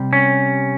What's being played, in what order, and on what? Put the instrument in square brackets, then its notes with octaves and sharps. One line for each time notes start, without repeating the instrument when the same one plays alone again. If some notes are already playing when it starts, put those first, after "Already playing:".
Already playing: [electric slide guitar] C3 G3
C#4